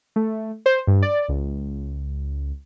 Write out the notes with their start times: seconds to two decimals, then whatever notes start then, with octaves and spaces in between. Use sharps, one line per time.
0.16 A3
0.66 C5
0.87 G2
1.02 D5
1.28 C#2